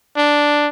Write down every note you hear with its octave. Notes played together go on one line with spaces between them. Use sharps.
D4